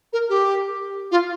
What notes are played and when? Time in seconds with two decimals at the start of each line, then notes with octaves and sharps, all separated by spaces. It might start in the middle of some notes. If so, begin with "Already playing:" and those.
0.13 A#4
0.29 G4
1.11 F4